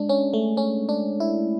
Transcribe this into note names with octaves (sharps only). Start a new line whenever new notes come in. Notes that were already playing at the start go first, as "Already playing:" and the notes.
Already playing: G#3 D4
C#4
A3
C#4
D4
E4